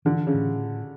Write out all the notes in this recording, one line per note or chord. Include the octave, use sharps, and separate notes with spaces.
D3 E3
C#3
A2